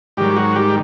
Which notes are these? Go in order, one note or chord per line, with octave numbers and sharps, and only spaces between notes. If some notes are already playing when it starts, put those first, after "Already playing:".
G#2 D#3 F#3 G3 G4
F#3 F#4
G3 G4